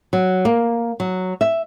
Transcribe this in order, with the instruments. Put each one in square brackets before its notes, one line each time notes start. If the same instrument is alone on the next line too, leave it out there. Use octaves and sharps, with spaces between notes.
[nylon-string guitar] F#3
A#3
F#3
E5